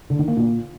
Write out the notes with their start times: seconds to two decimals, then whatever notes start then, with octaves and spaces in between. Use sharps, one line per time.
0.10 D3
0.19 D#3
0.28 A#3
0.37 A#2